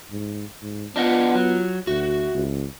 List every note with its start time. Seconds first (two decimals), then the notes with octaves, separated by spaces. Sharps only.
0.11 G#2
0.62 G#2
0.96 B3 D4 F4 D#5 F#5
1.35 F#3
1.87 D2 F#4 E5
2.35 C#2